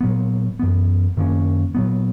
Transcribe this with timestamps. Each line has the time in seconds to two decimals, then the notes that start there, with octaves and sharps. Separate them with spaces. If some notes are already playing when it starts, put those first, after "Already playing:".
0.01 A#2 F#3 B3
0.59 F#2 E3 B3
1.17 F#2 D#3 A#3 C#4
1.75 A#2 F#3 B3